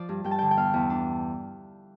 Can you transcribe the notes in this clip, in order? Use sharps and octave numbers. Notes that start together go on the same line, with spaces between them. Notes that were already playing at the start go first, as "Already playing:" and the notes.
Already playing: F3 D5
G2
G2 G5
A5
D3 G5
G5
E2 F5
E2
D4